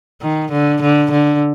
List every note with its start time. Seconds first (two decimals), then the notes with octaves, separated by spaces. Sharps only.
0.22 D#3
0.52 D3
0.82 D3
1.11 D3